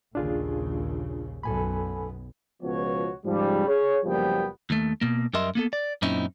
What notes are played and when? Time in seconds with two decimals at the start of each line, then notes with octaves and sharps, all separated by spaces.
0.15 A#1 D#2 C#3 D4 F4 G#4
1.43 B1 F#2 B3 A4 G#5 B5
2.62 C#2 B2 F3 B3 F#4 C#5
3.26 G#2 C#3 F3 G3
3.67 G#4 C#5
4.05 F#1 A#2 F3 G3 B3 G5
4.70 D#2 A3
5.01 B2 A#3
5.33 F#2 G3 A#4 D#5 E5 C6
5.55 A#3 B3 A4
5.73 D5
6.02 F#2 A#2 C4 C#4 D#4 E4